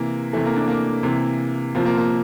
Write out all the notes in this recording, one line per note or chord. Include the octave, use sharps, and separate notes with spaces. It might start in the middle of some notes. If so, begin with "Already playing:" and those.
Already playing: C3 E3 A#3
C3 E3 A3
A#3
D4
A#3
C3 E3
C3 F3 A#3
A#3
A#3